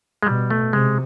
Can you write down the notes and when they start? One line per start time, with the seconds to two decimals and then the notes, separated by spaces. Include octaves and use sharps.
0.23 G#3
0.26 B2 G3
0.50 A3
0.73 C3 G#3